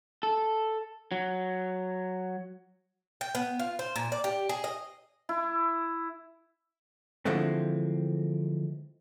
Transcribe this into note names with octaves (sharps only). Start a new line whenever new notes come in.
A4
F#3
G5
B3
F4
C5
A#2
D5
G4
G#4
D#5
E4
D3 E3 F3 G#3 A3 C4